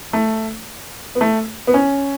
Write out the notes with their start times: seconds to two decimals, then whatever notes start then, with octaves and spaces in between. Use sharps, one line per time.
0.13 A3
1.15 B3
1.21 A3
1.67 B3
1.74 C#4